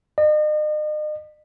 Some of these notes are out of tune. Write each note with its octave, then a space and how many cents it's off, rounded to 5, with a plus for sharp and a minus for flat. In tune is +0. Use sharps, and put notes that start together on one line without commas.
D#5 -40